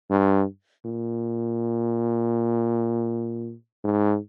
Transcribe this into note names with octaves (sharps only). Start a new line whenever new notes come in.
G2
A#2
G#2